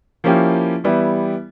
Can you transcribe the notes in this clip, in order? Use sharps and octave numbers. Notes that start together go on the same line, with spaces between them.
F3 A#3 C#4 E4 G4
E3 G3 B3 E4 G4